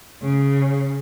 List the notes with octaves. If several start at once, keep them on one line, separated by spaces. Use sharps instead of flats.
C#3